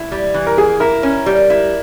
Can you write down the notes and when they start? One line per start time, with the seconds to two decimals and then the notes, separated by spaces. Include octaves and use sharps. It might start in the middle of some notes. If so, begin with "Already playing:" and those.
Already playing: E4
0.12 G3
0.34 E3
0.47 A#4
0.58 A#3 G#4
0.80 E4 A#4
1.03 C#4
1.26 G3
1.50 E4